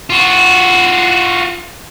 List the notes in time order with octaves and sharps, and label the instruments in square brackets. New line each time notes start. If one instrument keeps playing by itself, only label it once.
[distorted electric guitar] F4 F#4